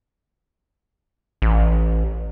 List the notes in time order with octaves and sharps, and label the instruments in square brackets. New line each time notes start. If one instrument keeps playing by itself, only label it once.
[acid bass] A1